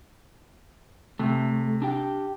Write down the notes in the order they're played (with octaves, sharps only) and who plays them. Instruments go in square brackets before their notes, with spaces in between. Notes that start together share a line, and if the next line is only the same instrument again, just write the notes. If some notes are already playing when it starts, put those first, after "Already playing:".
[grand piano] C3 [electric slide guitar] A3
[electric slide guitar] D4 G4 G5